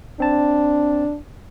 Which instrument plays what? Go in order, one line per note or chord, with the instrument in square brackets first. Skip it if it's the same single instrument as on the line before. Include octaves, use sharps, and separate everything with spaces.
[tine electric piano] C4 A5 [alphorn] D4